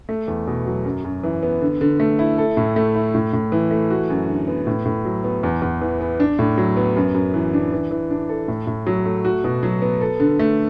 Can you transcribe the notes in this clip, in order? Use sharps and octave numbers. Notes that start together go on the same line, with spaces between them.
A3
E2
B2
F#3
F#2
F#2
E3
B3
D3
D3
A3
E4
A4
A2
A3
E4
A2
A2
E3
A3
F#4
F#2
D3
B3
A2
A2
F#3
B3
E2
E2
E3
B3
D4
A2
F#3
B3
F#2
F#2
E3
D4
E3
E3
D4
A4
A2
A2
F#3
A3
F#4
B2
F#3
B3
A4
D3
A3